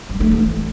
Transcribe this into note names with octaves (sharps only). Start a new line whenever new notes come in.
G3
A3
E3